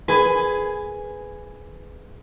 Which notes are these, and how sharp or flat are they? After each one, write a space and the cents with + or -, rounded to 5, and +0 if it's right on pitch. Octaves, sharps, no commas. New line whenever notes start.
G#4 +15 B4 +20 G#5 -5